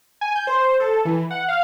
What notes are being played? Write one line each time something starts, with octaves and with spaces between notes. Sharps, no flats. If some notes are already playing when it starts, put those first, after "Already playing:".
G#5
G6
C5
A4
E3
F#5
F5